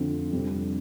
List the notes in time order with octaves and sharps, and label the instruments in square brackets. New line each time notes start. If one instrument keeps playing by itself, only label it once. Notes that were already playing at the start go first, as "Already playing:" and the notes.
Already playing: [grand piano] F2 D3 F3 A3 C4
F2 C3 G3 D4